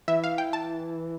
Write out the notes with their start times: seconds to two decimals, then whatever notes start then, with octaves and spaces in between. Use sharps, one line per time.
0.08 E3 E5
0.24 F5
0.38 G5
0.53 A5